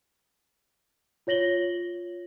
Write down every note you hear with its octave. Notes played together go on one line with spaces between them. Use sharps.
F4 C#5 A#6 F#7 G7